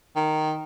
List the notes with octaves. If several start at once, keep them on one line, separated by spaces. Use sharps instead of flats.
D#3